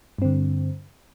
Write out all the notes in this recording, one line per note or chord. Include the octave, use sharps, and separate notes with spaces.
G2 D3 C4